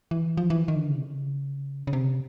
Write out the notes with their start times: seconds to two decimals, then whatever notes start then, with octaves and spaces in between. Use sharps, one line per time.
0.11 E3
0.37 F3
0.50 E3
0.68 D#3
0.76 D3
0.90 C#3
0.96 C3
1.03 C#3
1.87 C#3
1.93 C3